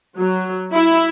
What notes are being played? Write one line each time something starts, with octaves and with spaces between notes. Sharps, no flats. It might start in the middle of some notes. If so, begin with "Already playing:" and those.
F#3
E4